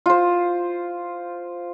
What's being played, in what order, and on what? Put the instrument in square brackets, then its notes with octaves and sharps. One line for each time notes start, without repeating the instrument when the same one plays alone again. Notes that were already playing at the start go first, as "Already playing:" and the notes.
[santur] F4 C5